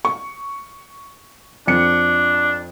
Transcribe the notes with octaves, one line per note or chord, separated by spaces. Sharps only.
C#6
F2 D4 C#7